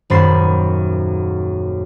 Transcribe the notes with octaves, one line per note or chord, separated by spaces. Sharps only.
D#1 F#2 C5 B5 A6 C7